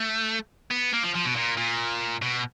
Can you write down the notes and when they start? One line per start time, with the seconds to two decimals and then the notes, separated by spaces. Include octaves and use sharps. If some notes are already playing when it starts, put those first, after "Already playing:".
Already playing: A3
0.71 B3
0.93 A#3
1.03 F3
1.14 F3
1.25 B2
1.36 A#2
1.57 A#2
2.22 B2